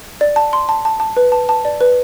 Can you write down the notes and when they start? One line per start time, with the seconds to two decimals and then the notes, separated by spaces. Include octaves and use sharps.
0.21 D5
0.36 A5
0.53 C6
0.69 A5
0.85 A5
1.00 A5
1.17 B4
1.32 A5
1.49 A5
1.65 D5
1.81 B4